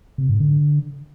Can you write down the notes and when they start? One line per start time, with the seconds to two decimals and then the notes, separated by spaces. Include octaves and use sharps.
0.18 C3
0.29 G#2
0.40 D3